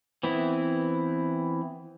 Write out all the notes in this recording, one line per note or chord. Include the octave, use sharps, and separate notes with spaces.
E3 B3 C4 E4